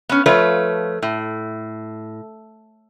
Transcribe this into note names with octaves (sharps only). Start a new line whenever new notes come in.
B3 C#4
F3 A3 F4 B4 C#5
A2